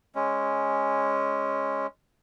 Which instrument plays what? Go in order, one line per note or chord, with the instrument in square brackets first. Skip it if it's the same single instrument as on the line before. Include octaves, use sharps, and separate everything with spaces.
[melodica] G#3 C#4